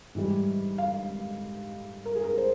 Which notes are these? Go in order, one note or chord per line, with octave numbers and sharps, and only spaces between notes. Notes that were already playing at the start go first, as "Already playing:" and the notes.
G#2 E3 G3
F5
A#4
G#4
A#4
C5